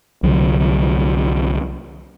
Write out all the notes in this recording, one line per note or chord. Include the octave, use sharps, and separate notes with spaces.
C2 D3 F3 F#3